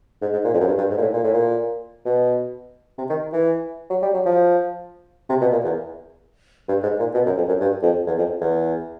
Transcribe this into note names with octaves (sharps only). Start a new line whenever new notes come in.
G#2
G#2
A#2
F2
F#2
G2
G2
G#2
A#2
A2
A#2
A2
A#2
B2
C3
D#3
E3
F#3
G3
F#3
F3
C3
B2
A#2
E2
G2
G#2
A#2
B2
F#2
F2
F#2
G2
F2
E2
F2
E2